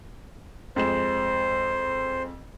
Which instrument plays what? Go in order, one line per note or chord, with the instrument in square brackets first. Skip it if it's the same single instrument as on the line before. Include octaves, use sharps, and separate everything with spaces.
[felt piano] F2 G#3 E7 [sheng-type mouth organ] C5